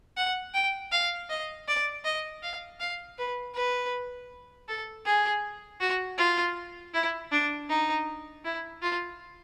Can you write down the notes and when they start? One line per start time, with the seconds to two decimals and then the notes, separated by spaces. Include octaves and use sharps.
0.17 F#5
0.54 G5
0.92 F5
1.30 D#5
1.68 D5
2.05 D#5
2.43 F5
2.80 F5
3.18 B4
3.55 B4
4.69 A4
5.06 G#4
5.81 F#4
6.18 F4
6.94 E4
7.32 D4
7.69 D#4
8.45 E4
8.82 F4